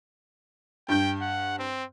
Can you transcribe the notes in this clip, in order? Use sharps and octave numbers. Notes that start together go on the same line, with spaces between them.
G2 G5 G6
F#5
C4